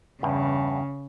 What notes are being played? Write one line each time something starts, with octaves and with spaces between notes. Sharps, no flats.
E2 G2 C#3